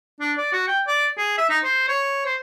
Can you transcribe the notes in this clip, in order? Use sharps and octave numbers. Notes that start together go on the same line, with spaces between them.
D4
D5
F#4
G5
D5
G#4
E5
D#4
C5
C#5
C5